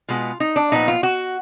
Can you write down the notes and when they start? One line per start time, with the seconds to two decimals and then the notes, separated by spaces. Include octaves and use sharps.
0.09 B2 G#3 B3 F4
0.40 D#4
0.56 D4
0.72 A#2 F3 B3 D#4
0.88 F4
1.03 F#4